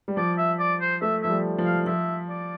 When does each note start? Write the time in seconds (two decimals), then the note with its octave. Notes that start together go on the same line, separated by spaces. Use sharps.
0.08 G3
0.17 F3 D5
0.38 E5
0.59 D5
0.81 C5
1.02 A3 E5
1.23 F3 E5
1.30 G3
1.58 F3
1.65 F5
1.86 F3 E5
2.29 D5